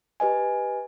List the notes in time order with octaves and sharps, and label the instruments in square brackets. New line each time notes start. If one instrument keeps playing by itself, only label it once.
[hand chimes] G4 B4 D#5 G#5